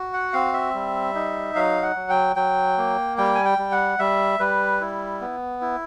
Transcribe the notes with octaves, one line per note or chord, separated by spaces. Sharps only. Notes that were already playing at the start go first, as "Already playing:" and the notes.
Already playing: F#4
F#5
C4 F5
E5
G3
D#4
F#3 F5
F#5
F#3
G5
F#3 G5
A#3
G3 G5
G#5
G5
G3
F#5
G3 E5
G3 B4
E4
B3
E4